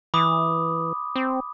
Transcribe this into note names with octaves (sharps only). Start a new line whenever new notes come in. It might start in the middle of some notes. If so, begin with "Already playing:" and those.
E3 B5 D6 D#6
C4